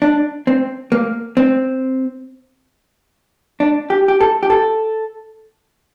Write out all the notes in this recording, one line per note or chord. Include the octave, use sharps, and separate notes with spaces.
D4
C4
A#3
C4
D4
G4
G4
A4
G4
A4